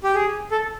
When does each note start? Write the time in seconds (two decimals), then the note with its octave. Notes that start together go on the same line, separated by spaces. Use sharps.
0.04 G4
0.15 G#4
0.51 A4